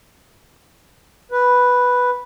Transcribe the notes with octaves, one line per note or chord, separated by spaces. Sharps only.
B4